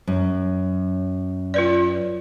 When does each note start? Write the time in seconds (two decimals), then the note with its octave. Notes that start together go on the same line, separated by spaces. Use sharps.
0.07 F#2
1.54 F4 B4 D5